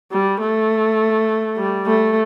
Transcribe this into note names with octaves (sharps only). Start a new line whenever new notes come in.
G3
A3
G3
A3